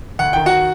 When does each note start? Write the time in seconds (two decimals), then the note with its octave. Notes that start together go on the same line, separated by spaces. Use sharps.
0.19 D2 F#5
0.33 D#3 G5
0.46 F#4 F#5